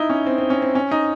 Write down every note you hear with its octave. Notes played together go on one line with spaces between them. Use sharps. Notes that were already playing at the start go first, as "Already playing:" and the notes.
Already playing: D#4 E4
C#4
C4
C4
C#4
C4
C#4
D#4